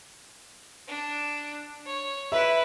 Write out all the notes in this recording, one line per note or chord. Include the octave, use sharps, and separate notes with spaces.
D4
C#5
E4 B4 E5